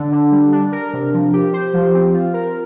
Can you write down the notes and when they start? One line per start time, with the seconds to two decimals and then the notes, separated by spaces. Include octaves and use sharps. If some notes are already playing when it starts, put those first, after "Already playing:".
Already playing: D3 D4
0.12 D3
0.31 G3
0.52 D4
0.72 A#4
0.93 C3
1.13 F3
1.33 G4
1.53 C5
1.73 F3
1.94 C4
2.14 F4
2.33 A#4